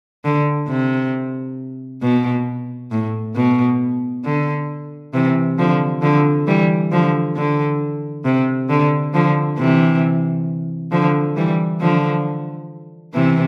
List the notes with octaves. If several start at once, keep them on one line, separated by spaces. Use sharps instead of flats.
D3
C3
B2
A2
B2
D3
C3 E3
D3 F3
D3 F3
E3 G3
D3 F3
D3
C3
D3
D3 F3
C3 E3
D3 F3
E3 G3
D3 F3
C3 E3